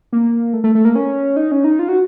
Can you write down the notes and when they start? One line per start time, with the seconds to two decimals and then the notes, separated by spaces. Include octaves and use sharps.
0.13 A#3
0.53 A3
0.64 A3
0.75 A3
0.85 A#3
0.96 C#4
1.36 D#4
1.51 C#4
1.64 D#4
1.79 F4
1.89 F#4